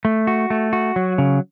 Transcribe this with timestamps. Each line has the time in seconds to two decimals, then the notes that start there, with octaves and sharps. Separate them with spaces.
0.05 A3
0.27 F#4
0.50 A3
0.73 F#4
0.96 F#3
1.18 C#3